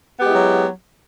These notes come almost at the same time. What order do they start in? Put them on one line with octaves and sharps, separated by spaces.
B3 G4 G#3 E4 F#3